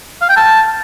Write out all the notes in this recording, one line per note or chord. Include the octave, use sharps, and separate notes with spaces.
F5
G5
A5